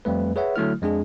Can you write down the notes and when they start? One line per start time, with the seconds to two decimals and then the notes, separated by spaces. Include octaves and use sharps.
0.05 F2 G3 A3 B4
0.36 G#4 B4 C#5 E5 F#5
0.56 D3 F#3 A3 E4 F6
0.82 F2 G#3 D4 G#4